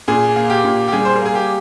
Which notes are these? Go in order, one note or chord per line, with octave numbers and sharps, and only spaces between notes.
A#2 G#4
A#3
G4
A#2
G4
G3 G#4
C5
A#4
A#3 G#4
G4